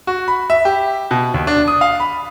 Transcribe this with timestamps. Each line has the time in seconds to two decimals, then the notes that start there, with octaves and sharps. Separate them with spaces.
0.07 F#4
0.28 B5
0.50 E5
0.65 G4
1.11 B2
1.34 D#2
1.47 D4
1.68 D#6
1.81 F5
2.00 B5